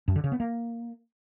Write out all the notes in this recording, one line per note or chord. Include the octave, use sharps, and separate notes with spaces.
F#2
D3
C#3
B3
A#3